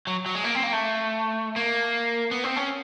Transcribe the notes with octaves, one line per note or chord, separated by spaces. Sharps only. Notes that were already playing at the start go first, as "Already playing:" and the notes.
F#3
F#3
G#3
A#3
C4
A#3
A3
A#3
B3
C4
C#4